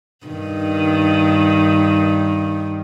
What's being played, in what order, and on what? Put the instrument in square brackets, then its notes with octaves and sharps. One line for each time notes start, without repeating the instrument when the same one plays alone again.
[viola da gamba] G2 D#3